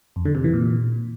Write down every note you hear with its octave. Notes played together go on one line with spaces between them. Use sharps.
F2
D3
C3
E3
A#2